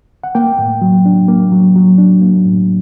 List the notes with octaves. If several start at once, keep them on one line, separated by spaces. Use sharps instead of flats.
F#5
A#3 G5
A2
F#3
D4
A#3
F#3
F#3
D4
A#3
A2